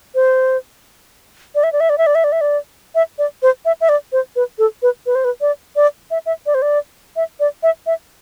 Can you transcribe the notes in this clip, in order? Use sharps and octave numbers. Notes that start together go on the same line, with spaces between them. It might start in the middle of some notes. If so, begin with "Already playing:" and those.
C5
D5
E5
D5
E5
D5
E5
D5
E5
D5
E5
D5
E5
D5
C5
E5
E5
D5
C5
B4
A4
B4
B4
C5
B4
D5
D5
E5
E5
D5
C5
D5
E5
D5
E5
E5